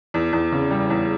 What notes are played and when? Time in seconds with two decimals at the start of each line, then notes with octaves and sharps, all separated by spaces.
0.14 E2
0.33 E2
0.52 C#3
0.71 G3
0.90 E2